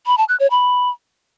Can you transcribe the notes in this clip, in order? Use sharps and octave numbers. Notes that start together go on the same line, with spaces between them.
B5
A5
F#6
C#5
B5